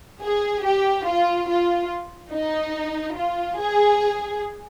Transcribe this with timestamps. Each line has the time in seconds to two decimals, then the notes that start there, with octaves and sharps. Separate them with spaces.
0.23 G#4
0.65 G4
1.07 F4
1.49 F4
2.33 D#4
3.17 F4
3.60 G#4